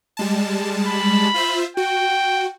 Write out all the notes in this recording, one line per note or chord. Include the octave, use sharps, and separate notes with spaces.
G3 G#3 A5
B5
F4 C5 E5
F#4 G5